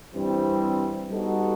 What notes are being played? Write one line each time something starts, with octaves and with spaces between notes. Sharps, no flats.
G2 E3 G3 C4
G3 B3 D#4 F#4 A4